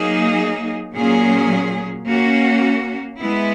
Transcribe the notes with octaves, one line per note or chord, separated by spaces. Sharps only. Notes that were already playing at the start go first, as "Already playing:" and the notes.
Already playing: F#3 A#3 D#4 G#4
A#2 F#3 A#3 C#4 G#4
A#3 C#4 F#4
G#3 B3 E4